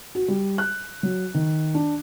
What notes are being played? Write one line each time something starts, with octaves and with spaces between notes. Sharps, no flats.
F#4
G3
F#6
F#3
D#3
D4